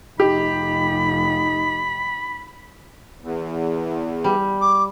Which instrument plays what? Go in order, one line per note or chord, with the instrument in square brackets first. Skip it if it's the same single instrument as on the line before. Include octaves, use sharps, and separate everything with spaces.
[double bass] F1 [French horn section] D#4 [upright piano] G4 [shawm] B5
[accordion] E2
[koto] G3
[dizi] D6